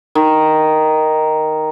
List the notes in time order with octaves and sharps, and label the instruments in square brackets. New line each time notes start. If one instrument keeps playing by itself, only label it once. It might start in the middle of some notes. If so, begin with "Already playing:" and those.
[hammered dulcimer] D#3